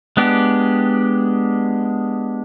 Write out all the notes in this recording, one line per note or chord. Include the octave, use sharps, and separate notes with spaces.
G#3 B3 D4 G4